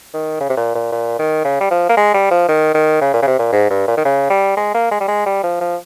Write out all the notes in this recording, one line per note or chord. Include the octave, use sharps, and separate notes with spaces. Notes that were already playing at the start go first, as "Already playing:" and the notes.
D#3
C#3
C3
A#2
A#2
A#2
D#3
C#3
G3
F3
A#3
G#3
G3
F3
D#3
D#3
C#3
A#2
C#3
C3
A#2
G#2
G2
A#2
D#3
C#3
G3
G#3
A#3
G#3
G3
G#3
G3
F3
F3